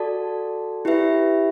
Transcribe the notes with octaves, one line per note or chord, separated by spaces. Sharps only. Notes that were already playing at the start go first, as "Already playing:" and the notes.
Already playing: F#4 A4 D5 A5
E4 G4 B4 E5